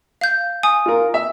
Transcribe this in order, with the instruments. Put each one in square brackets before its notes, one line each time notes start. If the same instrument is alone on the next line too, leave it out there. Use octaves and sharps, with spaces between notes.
[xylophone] F5 G6
G#5 D#6
[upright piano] F4 A#4
E5